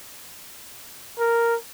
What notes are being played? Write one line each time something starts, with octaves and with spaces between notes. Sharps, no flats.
A#4